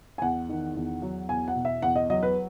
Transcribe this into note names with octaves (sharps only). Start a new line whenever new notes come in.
G#5
E2 F#5
D#3
E2
F#3
E2 G#5
F#5
B2
E5
E2 F#5
D#5
F#3 D#5
B4